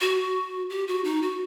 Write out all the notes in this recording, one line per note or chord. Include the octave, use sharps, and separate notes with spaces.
F#4
G4
F#4
D#4
F#4